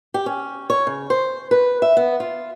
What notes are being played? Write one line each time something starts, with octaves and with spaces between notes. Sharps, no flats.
G4
C#4
C#5
C#3
C5
B4
E5
B3
F4